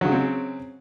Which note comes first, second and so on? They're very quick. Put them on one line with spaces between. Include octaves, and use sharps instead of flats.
F#3 C#3 G#3 C4